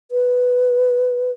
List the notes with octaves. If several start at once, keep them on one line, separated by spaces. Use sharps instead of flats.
B4